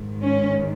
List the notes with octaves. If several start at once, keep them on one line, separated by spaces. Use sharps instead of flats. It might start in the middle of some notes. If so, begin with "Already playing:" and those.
Already playing: G#2 D#3
C#4